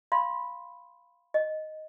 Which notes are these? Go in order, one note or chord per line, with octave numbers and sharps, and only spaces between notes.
F5 B5 C6
D#5